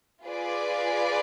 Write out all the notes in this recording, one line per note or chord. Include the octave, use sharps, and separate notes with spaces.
F4 G#4 B4 D5